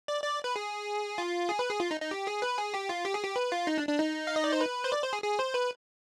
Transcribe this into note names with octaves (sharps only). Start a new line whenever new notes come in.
D5
D5
B4
G#4
F4
G#4
B4
G#4
F4
D#4
D#4
G4
G#4
B4
G#4
G4
F4
G4
G#4
G4
B4
F4
D#4
D4
D4
D#4
F5
D#5
D5
C5
B4
C5
D5
C5
G#4
G#4
C5
B4